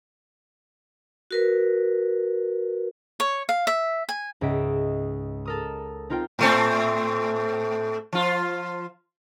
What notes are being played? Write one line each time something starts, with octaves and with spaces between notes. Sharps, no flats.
F#4 A#4 B4
C#5
F5
E5
G#5
C#2 G#2 D#5 E5 D7
A4 A#4 D#6
C4 D#4 F4 A#4 G5
A2 A3 C4
F3 F4